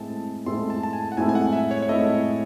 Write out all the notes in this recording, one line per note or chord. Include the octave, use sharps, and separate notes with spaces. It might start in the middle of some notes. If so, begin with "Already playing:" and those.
Already playing: A2 G#3 C4 E4 A4 A5
A2 G#3 C4 E4 A4 C6
A5
A5
G#5
F#5
A2 G#3 C4 E4 A4 G#5
G#5
F#5
E5
C#5
C#5
A2 G#3 C4 E4 A4 D#5